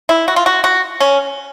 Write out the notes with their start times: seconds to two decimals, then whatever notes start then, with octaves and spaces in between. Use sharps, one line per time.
0.09 E4
0.28 F#4
0.36 F4
0.46 F#4
0.64 F#4
1.00 C#4